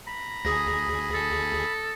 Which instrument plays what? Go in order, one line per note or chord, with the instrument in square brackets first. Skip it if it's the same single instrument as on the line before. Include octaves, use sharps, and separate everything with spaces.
[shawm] A#5 [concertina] B5
[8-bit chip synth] D2 G#4 [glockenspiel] D#6 A#6
[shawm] A4